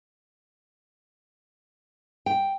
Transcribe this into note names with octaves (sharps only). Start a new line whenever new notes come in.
G5